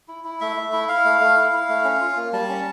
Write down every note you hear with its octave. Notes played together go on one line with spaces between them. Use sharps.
E4
E4
A3 E5
A3
E4
E4 F5
A3
A3
E4
E4
A3
C#4
F4
A#3
G3 A5
C#4